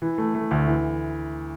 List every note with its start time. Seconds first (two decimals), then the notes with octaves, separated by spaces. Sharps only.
0.02 E3
0.18 A3
0.35 A3
0.51 D2
0.67 E3